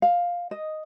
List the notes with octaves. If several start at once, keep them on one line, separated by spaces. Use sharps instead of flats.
F5
D#5